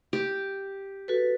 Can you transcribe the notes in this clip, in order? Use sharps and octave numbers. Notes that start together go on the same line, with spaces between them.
G4
F#4 A4 B4